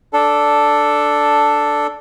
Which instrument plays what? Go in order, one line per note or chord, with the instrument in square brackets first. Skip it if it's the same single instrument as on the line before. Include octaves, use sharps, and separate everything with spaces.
[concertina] D4 A4